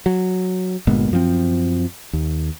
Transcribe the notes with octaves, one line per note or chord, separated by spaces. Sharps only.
F#3
G1 A#2 G#3 B3
F#2 F3 B3 C4
D#2